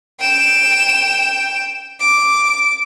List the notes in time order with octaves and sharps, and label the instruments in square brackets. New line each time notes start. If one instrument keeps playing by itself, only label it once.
[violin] G5 E7
D6